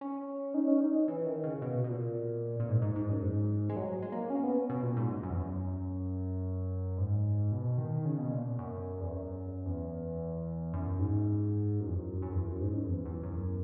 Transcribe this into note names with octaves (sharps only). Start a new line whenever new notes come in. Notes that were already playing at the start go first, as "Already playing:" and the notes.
C#4
D#4
C#4
D#4
E3
D#3
C#3
B2
B2
A#2
A#2
G#2
G#2
G#2
F#2
G#2
G#3
F#3
G#3
A#3
C#4
B3
B2
A#2
G#2
F#2
F#2
E2
F#2
G#2
B2
D#3
C#3
B2
A#2
F#2
E2
F#2
E2
F#2
G#2
F#2
E2
F#2
F#2
E2
F#2
G#2
F#2
E2
E2
F#2